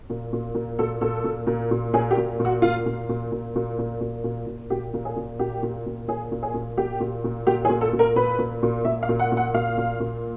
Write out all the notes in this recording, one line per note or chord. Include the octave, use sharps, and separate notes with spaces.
A#2
A#2
A#2
A#2 A4
A#2 A4
A#2
A#2
A#2
A#2 G#4
G4
A#2
A#2
F#4
A#2 F4
A#2
A#2
A#2
A#2
A#2
A#2
A#2
A#2
A#2 G4
A#2
G#4
A#2
A#2 G4
A#2
A#2
A#2 G#4
A#2
G#4
A#2
A#2 G4
A#2
A#2
A#2 G4
G#4
A#2
A4
A#2
A#4
A#2 B4
A#2
A#2
A#2 E5
F5
A#2
F#5
A#2
F#5
A#2 F5
A#2
A#2